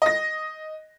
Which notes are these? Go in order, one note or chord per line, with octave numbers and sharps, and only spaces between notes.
D#5 A#6